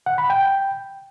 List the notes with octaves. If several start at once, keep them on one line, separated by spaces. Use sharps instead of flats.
F#5
B5
G5